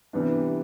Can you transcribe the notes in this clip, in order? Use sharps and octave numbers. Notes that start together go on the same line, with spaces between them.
C3 E3 G3 B3 D4